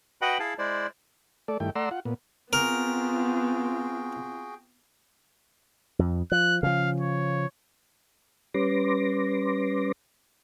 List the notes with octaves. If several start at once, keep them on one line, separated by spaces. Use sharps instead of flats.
F#4 B4 D#5 F#5 G5 B5
E4 G#4 F5 A5
G#3 E4 C5 D5
A3 A4 D5
G2 D#3 A3 E4 G5
A3 D5 F#5 A#5 C6 E6
F4 F#5
A#2 B3
B3 C4 F4 F#4 G#4 A#4 G5
F2
F3 F#6
C#3 F3 F5
C#5
G3 C#4 B4 C6 D6 A#6